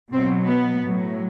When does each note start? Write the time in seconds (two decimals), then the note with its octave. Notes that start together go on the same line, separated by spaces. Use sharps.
0.12 B2 F#3 C4
0.47 B3
0.81 A2 F#3